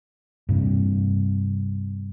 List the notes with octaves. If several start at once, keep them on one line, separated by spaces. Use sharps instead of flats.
G2 C3